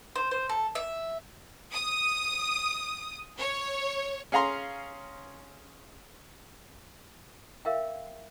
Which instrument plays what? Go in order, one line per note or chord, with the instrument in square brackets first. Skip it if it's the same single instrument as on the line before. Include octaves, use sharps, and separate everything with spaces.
[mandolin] C5
C5
A4
E5
[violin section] D#6
C#5
[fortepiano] C#4 G#4 F5 A#5 C6
[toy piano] A#4 E5 F5 G5